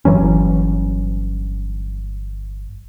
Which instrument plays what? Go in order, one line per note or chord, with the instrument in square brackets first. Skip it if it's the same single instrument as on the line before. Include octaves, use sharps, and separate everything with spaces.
[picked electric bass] G1 E3 F#3 C#4